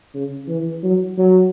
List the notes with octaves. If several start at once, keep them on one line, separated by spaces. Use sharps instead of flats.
C#3
E3
F#3
F#3